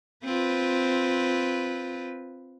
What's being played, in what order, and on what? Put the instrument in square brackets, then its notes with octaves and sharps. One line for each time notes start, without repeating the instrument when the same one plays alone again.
[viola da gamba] C4 F4 B4